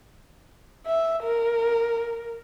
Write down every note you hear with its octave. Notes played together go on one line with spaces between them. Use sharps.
E5
A#4